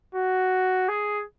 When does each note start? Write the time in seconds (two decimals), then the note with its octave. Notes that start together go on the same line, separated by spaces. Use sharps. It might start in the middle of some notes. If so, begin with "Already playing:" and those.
0.15 F#4
0.89 G#4